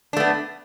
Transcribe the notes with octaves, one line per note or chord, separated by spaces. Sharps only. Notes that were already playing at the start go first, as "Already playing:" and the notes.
A3 B3 D4